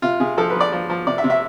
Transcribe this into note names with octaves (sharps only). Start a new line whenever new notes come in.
C3 F4
C3 G#4
F3 A4
B4
F3
D5
F3
F3
C3 D5
E5
C3
E5